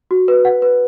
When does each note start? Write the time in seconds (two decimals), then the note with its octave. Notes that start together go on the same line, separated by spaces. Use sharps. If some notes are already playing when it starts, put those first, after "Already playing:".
0.11 F#4
0.28 B4
0.45 F#5
0.62 B4